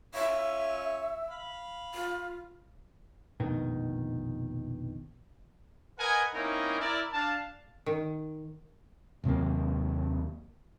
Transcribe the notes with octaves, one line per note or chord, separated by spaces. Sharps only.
C#4 F4 C#5 E5
F5 B5
F4
F1 A#1 B2 D#3
A#4 B4 D#5 F#5 G#5
A#3 C4 C#4 D#4 E4 A#4
E4 A#4 D5
D4 F5 A5
D#3
D#2 C3 F#3 A#3